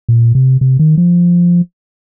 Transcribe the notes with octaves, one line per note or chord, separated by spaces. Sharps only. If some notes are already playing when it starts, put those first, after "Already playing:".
A#2
C3
C3
D#3
F3